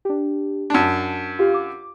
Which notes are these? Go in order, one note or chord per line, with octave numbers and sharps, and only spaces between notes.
D4 G4
F#2 D4 A5
F4 G4 F5
D6